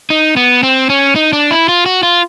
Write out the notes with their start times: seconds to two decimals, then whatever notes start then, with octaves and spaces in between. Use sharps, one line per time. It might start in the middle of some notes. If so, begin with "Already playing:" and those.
0.10 D#4
0.37 B3
0.63 C4
0.90 C#4
1.16 D#4
1.33 D4
1.51 E4
1.69 F4
1.86 F#4
2.03 F4